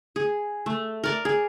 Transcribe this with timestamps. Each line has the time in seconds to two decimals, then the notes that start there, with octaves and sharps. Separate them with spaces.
0.16 G#4
0.66 A3
1.04 A#4 D5
1.25 G#4